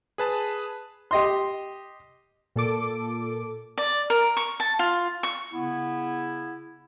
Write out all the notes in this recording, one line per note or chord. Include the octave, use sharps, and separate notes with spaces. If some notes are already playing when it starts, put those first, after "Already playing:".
G#4 B4 A5
G4 D#5 C6
A#2 A4 D6
D5
A#4
C#6
A5
F4
C#6
C#3 B3 E4